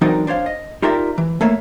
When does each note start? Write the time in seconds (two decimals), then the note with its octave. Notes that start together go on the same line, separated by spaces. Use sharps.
0.01 E3 F#3 C4 D4 D#4 A#4
0.27 D4 C5 C#5 F5
0.46 D#5
0.82 D#4 F4 G4 A#4 D5 E5
1.18 E3
1.41 A3 A#3 C#5 E5